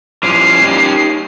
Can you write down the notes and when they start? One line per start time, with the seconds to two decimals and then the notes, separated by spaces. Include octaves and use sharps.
0.23 E3 F3 G3 C#4 C7
0.63 D#4 G4